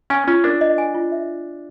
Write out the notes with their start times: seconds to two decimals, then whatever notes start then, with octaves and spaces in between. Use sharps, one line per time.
0.10 C#4 G#5
0.28 C#4 F4
0.44 D4 A#4
0.61 D#5
0.78 G#5
0.94 F4
1.12 E5